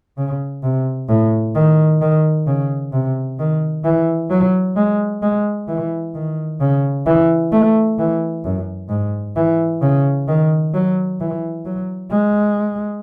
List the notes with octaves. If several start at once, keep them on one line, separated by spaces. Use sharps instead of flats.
C#3
C3
A2
D#3
D#3
C#3
C3
D#3
E3
F#3
G#3
G#3
E3
D#3
C#3
E3
A3
E3
F#2
G#2
E3
C#3
D#3
F#3
E3
F#3
G#3